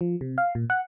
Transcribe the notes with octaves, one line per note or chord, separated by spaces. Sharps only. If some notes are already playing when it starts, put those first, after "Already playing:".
F3
C3
F5
A#2
F#5